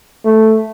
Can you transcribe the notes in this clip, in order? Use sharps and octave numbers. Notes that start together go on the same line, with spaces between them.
A3